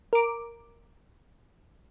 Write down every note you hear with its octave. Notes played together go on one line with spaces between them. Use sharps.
A#4 D6